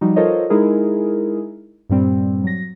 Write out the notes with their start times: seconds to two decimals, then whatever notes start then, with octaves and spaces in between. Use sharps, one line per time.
0.01 F3 G3 D#4 F#4
0.16 F4 A4 A#4 C5 C#5 D#5
0.50 G#3 D#4 E4 G#4 A#4
1.89 G2 A#2 G3 C4
2.44 F#3 A#6